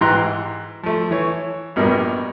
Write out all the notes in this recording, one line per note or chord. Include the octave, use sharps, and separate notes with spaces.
G#2 E3 G4 A#5 C6 F#6
F3 A3
E3 C#5
A#1 G2 B2 A#4